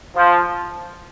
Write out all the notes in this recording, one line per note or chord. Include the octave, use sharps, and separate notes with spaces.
F3